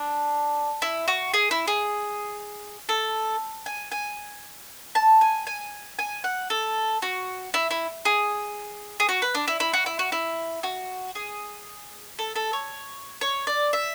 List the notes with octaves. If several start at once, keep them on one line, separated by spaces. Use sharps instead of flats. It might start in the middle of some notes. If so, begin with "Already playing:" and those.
Already playing: D4
E4
F#4
G#4
E4
G#4
A4
G#5
G#5
A5
G#5
G#5
G#5
F#5
A4
F#4
E4
E4
G#4
G#4
F#4
B4
D4
E4
E4
F#4
E4
F#4
E4
F#4
G#4
A4
A4
C#5
C#5
D5
E5